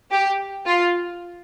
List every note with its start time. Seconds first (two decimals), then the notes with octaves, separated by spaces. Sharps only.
0.11 G4
0.66 F4